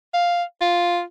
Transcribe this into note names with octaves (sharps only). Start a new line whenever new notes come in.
F5
F4